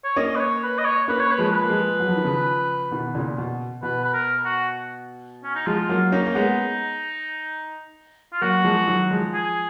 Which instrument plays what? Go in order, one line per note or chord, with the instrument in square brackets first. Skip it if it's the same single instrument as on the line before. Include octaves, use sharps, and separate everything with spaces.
[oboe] C#5
[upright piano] A#3 C#4 [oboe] D#5
[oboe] B4
C#5
B4
D#5
C#5
[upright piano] A#3 C#4 [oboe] B4
[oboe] C#5
B4
[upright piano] F3 G#3
[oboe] B4
[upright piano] A#3
F3 G#3
F#3
F3
D#3
C#3 F3
B2 D#3
A#2 C#3
B2
[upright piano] B2 [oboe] B4
[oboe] B4
A#4
F#4
C#4
D#4
[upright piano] F3 G#3 [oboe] F4
[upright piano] F#3 A#3
[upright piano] A#3 C#4 [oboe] D#4
[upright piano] A#3
G#3 B3
[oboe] F4
[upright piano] F#3 A#3 [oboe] F#4
[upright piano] F3 G#3
D#3 F#3
F3 G#3
[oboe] G#4